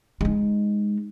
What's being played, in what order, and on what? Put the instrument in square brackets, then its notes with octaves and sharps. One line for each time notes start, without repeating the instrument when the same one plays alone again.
[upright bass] G#3 D#4